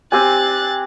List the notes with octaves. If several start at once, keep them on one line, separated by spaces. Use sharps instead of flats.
C4 G4 G#5 F#6 A6